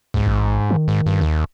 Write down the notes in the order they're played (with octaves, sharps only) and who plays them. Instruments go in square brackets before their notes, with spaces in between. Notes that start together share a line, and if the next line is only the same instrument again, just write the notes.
[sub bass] C2 [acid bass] G#2
[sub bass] A1
D#3
[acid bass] G#2
G2
D#2